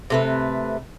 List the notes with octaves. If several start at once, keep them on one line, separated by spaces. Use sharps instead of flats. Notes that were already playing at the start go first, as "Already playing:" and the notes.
C3 A3 B4